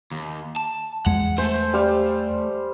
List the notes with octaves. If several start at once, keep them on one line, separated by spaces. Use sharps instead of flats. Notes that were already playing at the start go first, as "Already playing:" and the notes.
D#2
A5
E2 G#3 F#5
A3 C5 G#5
G3 C5 F5